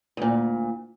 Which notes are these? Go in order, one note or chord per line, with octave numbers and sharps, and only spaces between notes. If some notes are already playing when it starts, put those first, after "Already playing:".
D2 A#2